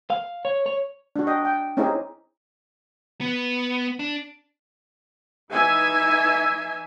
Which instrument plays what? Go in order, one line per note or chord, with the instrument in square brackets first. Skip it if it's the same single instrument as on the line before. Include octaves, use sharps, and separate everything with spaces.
[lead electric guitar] F5
C#5
C#5
[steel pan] D4 F#4
D#5 G5
G5
C4 C#4 D#4 E4 G4 G#4
[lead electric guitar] B3
D4
[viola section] E3 D#4 E5 G#5